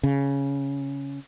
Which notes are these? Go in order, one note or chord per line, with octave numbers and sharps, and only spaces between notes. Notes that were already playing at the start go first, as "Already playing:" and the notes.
C#3